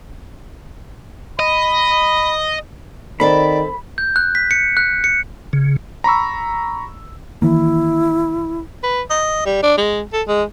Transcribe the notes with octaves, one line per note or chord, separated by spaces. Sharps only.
D#5 B5
D#3 C4 A4 D5 B5
G6
F#6
B6
C#7
F#6
C#7
C#3
A#5 B5 C#6 E6
D#3 E3 A#3 E4
B4
D#5
G3
D4
G#3
A4
G#3